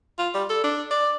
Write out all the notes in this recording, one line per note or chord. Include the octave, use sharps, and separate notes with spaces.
F4
G3
A4
D4
D5